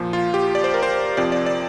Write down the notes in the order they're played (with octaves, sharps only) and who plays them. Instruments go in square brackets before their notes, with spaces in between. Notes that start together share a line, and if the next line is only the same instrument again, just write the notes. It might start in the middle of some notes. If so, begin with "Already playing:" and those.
Already playing: [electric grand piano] A#2 F3
F4
G4
D5
C5
A#4
C5
F2 C3 F3 D5
D5
D5